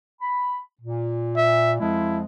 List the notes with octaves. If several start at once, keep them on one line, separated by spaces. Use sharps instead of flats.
B5
A#2
E5
F2 F3 G#3 E4